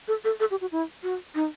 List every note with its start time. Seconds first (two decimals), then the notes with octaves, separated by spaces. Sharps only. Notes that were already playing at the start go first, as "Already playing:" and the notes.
0.08 A4
0.24 A4
0.40 A4
0.51 G4
0.61 F#4
0.72 E4
1.03 F#4
1.35 D#4